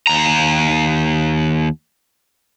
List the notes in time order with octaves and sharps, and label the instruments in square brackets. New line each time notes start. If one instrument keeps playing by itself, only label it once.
[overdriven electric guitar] D#2 A#5